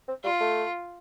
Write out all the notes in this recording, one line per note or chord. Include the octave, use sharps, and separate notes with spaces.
C4
G3 F4
A3